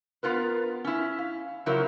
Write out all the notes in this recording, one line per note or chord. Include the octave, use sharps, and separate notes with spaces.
B3 F4 A#4 B4
C#4 E4
F5
C#3 F3 F#3 E4 A#4